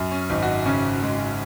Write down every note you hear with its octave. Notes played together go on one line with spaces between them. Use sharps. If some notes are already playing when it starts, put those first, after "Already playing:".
Already playing: F#2
C#4
G#1 D#4
F#4
D#4
C#3 C#4
G#3